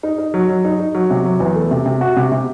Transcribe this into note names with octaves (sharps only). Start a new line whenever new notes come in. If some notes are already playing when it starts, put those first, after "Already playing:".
D#4
D#4
F#3
F#3
D#4
D#4
F#3
C3
F#3
E2
A3
C3
C3
F#4
C3
C3